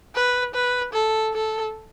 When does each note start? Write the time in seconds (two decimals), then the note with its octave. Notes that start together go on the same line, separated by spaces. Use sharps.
0.15 B4
0.54 B4
0.94 A4
1.33 A4